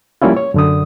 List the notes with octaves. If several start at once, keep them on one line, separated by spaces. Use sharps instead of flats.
F3 G3 A#3 C#4 E4 F4
C#5
F#2 D3 D#6